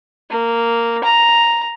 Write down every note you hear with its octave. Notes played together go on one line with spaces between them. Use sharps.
A#3
A#5